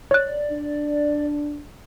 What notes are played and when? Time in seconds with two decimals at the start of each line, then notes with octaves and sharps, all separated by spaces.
0.11 C#5 D5 F#6
0.51 D4